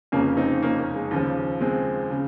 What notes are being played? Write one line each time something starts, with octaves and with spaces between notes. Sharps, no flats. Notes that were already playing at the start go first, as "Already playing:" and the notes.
F1 F2 C#3 A#3 C#4
C4 D#4
A#3 C#4
A#3
G#3
D#2 C#3 F3
G#3 C4
C#3